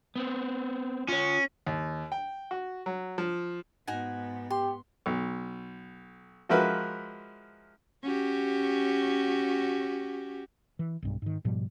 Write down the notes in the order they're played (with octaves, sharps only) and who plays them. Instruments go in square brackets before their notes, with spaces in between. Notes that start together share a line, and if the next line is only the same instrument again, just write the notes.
[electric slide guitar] B3 C4
[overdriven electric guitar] C#4 [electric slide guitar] F4 C#5
[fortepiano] D#2
G5
F#4
F#3
F3
[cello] G#2 B3 [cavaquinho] D#4 F#4 G#5
[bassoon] G4 [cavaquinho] C6
[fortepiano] B1
F3 G#3 F#4 A#4 B4 E5
[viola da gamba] C#4 F#4 G4
[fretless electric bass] E3
B1 G2
G#2 D#3
G#2 B2 F3 G3